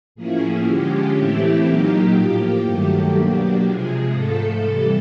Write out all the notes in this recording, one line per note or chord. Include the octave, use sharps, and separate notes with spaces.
A2 F3 A#3 C#4 E4 G#4
D3 F3 G#3 C#4 G4
A2 E3 A3 C4 E4 G4
A#2 F#3 A#3 D#4
A2 F3 A#3
G2 D#3 F#3 A3
B2 F#3 A#3 D4 G4
C3 F3 G#3 G#4
G#2 F3 A3 A4
C3 E3 G3